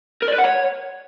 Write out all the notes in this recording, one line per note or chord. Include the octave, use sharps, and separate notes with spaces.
A#4
D5
B4
F#5
C#5